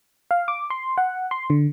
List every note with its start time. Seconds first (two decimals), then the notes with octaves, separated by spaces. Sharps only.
0.31 F5
0.48 D6
0.70 C6
0.98 F#5
1.31 C6
1.50 D3